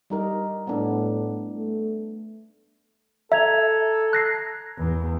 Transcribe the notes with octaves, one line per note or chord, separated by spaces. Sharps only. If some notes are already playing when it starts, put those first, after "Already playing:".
G3 D#4 A#4
A2 B3 D4
A3
A4 E5 A#5 G#6 F7
F#6 A#6 C7
E2